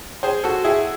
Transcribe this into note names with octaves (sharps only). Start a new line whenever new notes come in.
G#4 C5
F#4 A4
E4 G#4